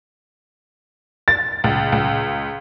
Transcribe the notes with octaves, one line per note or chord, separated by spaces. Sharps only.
A6
C#2
C#2